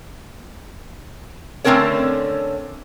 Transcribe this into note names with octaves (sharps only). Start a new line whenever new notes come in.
D3 A3 C4 C#4 A#4 C#5